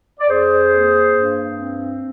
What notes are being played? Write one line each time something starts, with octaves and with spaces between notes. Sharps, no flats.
D5
F2 G#4 C5
A#3
G2
C4